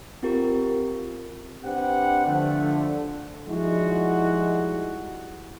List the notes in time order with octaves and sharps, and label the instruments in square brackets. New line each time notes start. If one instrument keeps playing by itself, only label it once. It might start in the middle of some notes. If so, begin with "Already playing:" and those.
[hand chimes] C4 F4 G4 A#4
[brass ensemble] C4 D4 G4 B4 F#5
D3 F3 A3
F3 G3 G#3 D#4 E4 F#4